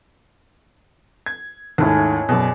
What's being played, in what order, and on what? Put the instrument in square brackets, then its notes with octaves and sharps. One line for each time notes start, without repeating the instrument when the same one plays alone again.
[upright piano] G#6
[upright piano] D#2 G#2 A3 [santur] C#4 E4 A4
[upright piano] F#2 B2 [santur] G#4 D5